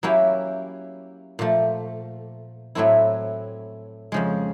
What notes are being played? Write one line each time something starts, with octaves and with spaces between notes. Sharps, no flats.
F#3 A#3 C#4 E4 G4
A#2 F3 A3
A2 F#3 A3 C4 E4
F2 C#3 F3 G#3